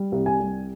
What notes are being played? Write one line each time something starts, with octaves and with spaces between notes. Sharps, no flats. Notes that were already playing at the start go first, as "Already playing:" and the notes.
Already playing: G3
C2
G#5
G3